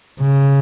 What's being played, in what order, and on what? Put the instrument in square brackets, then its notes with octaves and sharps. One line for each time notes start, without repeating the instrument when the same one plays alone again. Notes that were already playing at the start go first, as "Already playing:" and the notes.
[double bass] C#3